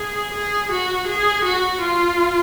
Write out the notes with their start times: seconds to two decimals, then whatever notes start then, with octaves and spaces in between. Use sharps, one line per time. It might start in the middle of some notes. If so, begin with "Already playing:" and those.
Already playing: G#4
0.34 G#4
0.71 F#4
1.07 G#4
1.44 F#4
1.81 F4